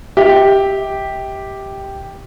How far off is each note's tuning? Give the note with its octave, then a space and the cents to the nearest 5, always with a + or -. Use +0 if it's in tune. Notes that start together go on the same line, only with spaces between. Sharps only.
G4 +0 E5 -40